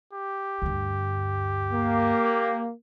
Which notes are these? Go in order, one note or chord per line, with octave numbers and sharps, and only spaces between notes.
G4
D2 G2
A#3